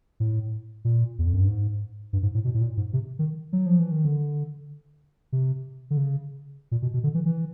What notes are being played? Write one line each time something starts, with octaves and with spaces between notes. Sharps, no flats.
A2
A#2
E2
F2
F#2
G2
G#2
G2
G#2
A2
B2
A2
A#2
G#2
C3
D#3
F#3
F3
E3
D#3
D3
C3
D3
C#3
A#2
B2
B2
D3
E3
E3